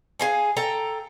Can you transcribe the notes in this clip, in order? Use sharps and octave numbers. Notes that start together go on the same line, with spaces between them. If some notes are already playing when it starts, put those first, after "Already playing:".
G#4 F5 G#5
A4 G5 A#5